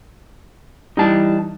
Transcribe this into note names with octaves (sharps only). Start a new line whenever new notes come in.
E3 G3 D#4 A5